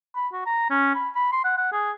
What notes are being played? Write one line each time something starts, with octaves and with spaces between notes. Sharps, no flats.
B5
F#4
A#5
C#4
B5
B5
C6
F#5
F#5
G#4